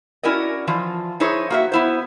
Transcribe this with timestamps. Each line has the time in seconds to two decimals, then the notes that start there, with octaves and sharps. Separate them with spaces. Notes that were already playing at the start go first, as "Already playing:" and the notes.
0.23 C#4 E4 F#4 A#4 D5 D#5
0.67 E3 F3 F4
1.20 D#4 E4 G#4 C5 C#5
1.50 A#3 F#4 E5
1.72 B3 E4 C5